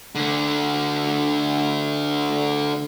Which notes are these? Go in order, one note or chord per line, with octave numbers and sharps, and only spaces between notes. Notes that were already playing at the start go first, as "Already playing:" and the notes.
D3 A3